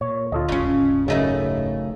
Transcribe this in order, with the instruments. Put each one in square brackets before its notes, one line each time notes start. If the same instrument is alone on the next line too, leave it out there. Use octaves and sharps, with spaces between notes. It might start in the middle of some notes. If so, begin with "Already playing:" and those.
[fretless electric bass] A#2 [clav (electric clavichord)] C#5
[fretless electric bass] D2 [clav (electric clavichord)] F4 A4 D#5
[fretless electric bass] D#1 G#1 [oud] C#3 C#4
[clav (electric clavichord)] F#2 C#3 [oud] A3 D#4 E4